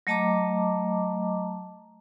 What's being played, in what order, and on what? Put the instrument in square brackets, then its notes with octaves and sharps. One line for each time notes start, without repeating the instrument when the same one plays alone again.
[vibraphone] F#3 A3 D#5 A5 A#5 D6